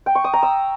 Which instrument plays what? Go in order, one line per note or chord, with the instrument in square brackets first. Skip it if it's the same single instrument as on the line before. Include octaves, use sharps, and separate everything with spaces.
[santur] G5
C#6
D#6
A#5
E6